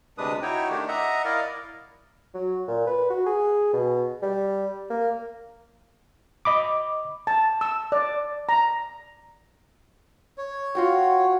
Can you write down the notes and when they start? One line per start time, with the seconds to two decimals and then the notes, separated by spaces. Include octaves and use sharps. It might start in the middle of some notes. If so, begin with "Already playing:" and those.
0.18 D2 C3 G#3 D4 B4 D#6
0.42 D#4 E4 F#4 C#5 G5
0.70 D#3 A3 D4 G4
0.88 D#5 E5 F#5 A#5
1.25 E4 A#4 D5 D#5 F5
2.34 F#3
2.68 A#2
2.87 B4
3.10 F#4
3.26 G#4
3.73 B2
4.22 G3
4.90 A#3
6.45 D#5 B5 D6
7.27 A5
7.61 E6
7.92 D5
8.49 A#5
10.38 C#5
10.75 F4 F#4 G5